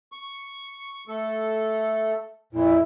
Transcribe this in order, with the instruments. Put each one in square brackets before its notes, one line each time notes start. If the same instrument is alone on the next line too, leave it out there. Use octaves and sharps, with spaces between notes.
[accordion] C#6
A3 A4
[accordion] F2 A#2 [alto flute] E4